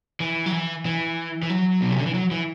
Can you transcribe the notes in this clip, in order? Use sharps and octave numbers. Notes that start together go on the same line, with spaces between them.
E3
F#3
E3
E3
E3
F#3
B2
C3
D3
E3
F#3
E3